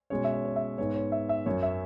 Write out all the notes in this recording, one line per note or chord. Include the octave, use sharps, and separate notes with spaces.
B2 G#3 C#4 C#5
E5
C#5
C#5
E5
G#2 G#3 B3 C#5
C#5
E5
E5
F#2 F#3 C#4 C#5
E5